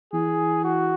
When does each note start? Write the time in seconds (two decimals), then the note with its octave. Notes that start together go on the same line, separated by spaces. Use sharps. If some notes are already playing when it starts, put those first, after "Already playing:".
0.13 E3 G#4
0.64 F#4